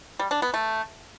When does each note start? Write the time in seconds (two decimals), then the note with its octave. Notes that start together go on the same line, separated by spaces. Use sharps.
0.19 G3
0.31 D4
0.42 B3
0.54 A3